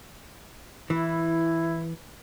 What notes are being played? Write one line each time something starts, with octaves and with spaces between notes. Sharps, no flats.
E3 E4